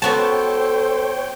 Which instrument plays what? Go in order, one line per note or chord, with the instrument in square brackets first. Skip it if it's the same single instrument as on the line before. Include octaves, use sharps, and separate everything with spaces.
[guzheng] B3 F#4 A5 [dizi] A4 [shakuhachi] C5 [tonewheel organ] C#5 G5